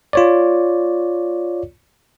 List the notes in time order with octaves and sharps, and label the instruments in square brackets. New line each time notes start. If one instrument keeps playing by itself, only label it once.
[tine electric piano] F4 C#5 D5